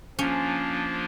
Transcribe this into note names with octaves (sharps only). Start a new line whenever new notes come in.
F3 A#3 C#4 D4 F4